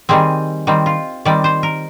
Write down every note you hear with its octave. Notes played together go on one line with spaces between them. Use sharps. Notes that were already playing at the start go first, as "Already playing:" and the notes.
D#3 G3 C4 G#4
D#3 G3 C4
F4
D#3 G3 C4 D5
C5
A#4